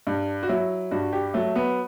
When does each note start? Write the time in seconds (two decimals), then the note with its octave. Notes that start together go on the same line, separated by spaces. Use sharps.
0.07 G2
0.43 F#4
0.49 F#3 E4
0.91 G2 F#4
1.13 G4
1.34 F#3 A3
1.55 B3